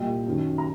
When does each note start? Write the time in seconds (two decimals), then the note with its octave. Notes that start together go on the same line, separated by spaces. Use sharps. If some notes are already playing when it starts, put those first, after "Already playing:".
Already playing: C2 A#2 D#5 G5
0.26 F#2 D#3
0.58 A#5